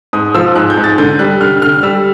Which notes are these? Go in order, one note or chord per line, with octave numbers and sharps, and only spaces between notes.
G#2 D#6
F3 E6
G#2 F#6
G6
G#2
A6
D3 G6
G3 F#6
D3 F6
D3 F6
G3 E6